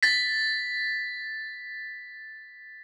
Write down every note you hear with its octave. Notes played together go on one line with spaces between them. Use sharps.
A6 B6